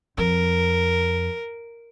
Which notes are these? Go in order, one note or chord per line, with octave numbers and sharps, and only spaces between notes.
F2 A#4